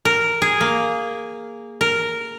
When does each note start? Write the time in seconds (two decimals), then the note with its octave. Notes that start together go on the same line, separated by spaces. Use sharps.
0.05 A#4
0.42 G#4
0.61 A#3
1.81 A#4